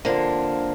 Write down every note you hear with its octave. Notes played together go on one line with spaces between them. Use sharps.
F2 D3 F3 A#3 D4